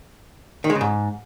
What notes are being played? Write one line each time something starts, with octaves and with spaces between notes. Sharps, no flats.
D#3
G#3
C#3
G#2